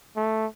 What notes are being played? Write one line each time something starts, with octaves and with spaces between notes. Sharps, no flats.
A3